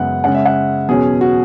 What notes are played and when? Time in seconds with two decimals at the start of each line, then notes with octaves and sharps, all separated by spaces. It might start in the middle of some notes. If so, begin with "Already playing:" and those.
Already playing: F#2 C#3 G#3 B3 E5 F#5
0.24 C#3 G#3 C#4 F#5
0.35 E5
0.45 F#5
0.89 E2 B2 F#3 C#4 G#4
1.21 F#4